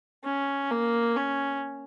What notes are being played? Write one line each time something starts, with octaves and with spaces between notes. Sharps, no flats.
C#4
A#3
C#4